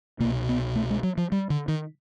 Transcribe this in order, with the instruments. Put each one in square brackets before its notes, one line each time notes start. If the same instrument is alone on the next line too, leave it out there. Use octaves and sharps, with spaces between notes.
[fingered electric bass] B2 A#3
C2
B3
A3
G#3
F#3
F3
G3
D3
D#3